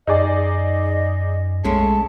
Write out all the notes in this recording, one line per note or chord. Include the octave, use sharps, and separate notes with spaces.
F#2 D#4 G#4 D5 D#5
B1 G#3 A3 C#4 A5